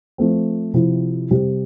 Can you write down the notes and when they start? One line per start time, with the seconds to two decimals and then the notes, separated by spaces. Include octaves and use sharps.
0.18 F3 A3 C4
0.74 C3 F3 C4 E4
1.30 C3 G3 C4 G4